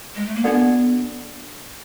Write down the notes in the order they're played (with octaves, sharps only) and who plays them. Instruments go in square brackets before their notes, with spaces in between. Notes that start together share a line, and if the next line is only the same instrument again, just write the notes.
[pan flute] G#3
A3
A#3
[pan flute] B3 [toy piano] D4 F#4 A4 D5 F#5